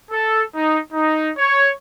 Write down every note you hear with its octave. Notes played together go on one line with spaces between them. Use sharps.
A4
D#4
D#4
C#5